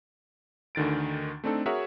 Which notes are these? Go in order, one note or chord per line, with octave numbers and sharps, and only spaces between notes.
D2 D3 D#3 A6 D7
A3 C4 D4 D#4 A4
F#4 G#4 A#4 C#5 E5 F#5